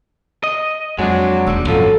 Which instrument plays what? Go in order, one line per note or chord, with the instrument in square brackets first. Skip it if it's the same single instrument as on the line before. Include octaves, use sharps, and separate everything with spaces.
[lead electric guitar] D#5
[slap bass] F2 [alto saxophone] F#3 [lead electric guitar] G#3 D4
[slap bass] D#1 G3 [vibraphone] E6
[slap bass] G#1 F#2 [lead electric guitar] F3 [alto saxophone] F#3 [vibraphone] A4